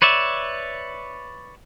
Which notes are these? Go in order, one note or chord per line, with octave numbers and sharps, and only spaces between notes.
B4 C#5 D5 E5